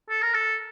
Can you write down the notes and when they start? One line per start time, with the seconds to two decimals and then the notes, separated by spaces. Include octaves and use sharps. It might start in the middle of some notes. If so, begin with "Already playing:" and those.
0.09 A4
0.22 A#4
0.34 A4